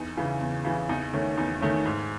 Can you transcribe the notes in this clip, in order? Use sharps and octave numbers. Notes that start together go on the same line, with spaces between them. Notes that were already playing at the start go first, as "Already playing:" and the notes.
Already playing: E2 D#4
C#3 E3
E2
C#3 E3
E2 D#4
D#3 A3 C#4
E2 D#4
D#3 A3 C#4
G#2